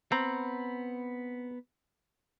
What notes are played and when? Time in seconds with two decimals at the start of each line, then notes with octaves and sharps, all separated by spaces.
0.12 B3 C4 A#5 B5